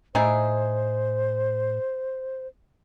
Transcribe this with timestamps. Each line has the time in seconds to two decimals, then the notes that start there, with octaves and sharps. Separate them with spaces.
0.15 A2 D#4 E4 G#4 C5